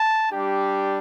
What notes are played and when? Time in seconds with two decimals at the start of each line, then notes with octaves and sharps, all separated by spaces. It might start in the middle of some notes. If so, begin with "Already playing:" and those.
Already playing: A5
0.31 G3 D4 G4